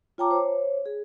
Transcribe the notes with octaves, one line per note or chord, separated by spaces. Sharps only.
F4 C#5 G5 A5 A#5 D6
C5 C#5
G#4